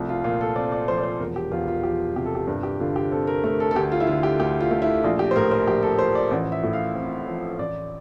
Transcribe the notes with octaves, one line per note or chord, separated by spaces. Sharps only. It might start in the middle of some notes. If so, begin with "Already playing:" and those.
Already playing: C2 F3 A3
F4
A#2 F4
A4
C4 D5
D5
F3 C5
D5
C5
E1 A#4
G4
E2 F4
F4
F3 G4
C3 G4
A4
G4
G2
G4
D3 F4
G4
C4 A4
A#4
A3 A#4
A4
A4
D2 G4
F4
E4
D3 F4
G4
D2 G4
F4
A3
E4
A#1 F4
G4
C5
A2 A#4
C5
A#1 G4
A4
F3 C5
D5
A1 D5
E5
A2
F5
C4
F3
A1 D5